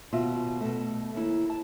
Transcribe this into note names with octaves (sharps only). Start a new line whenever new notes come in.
D#2 B2 F4 E5
B2 A3
D#2 E4
A5